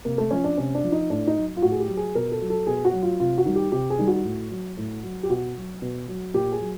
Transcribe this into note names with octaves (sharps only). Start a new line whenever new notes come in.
C3 A#3
A3
F3 C#4
D4
C3 C#4
D4
F3
D#4
A2 D4
D#4
F#3
F4
A2 F#4
G#4
G4
F#3
G#4
B2 A#4
A4
F#3
A4
B2 G#4
F#4
F#3
F4
C3 F4
F#4
D#3 G3
G4
C3 G4
G#4
D#3 G3
F#4
A2
F#3
A2
F#3
G4
B2 F#4
F#3
B2
F#3
A#2 G4
G#4
F#3